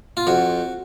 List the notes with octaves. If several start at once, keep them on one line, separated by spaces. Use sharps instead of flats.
F4
F2 F#4